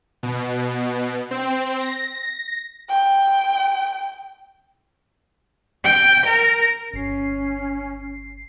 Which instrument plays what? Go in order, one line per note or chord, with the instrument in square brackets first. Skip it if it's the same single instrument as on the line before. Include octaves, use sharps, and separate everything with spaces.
[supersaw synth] B2
C4
A#6
[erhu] G5
[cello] G5
A#4
[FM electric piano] G1 C7 [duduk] C#4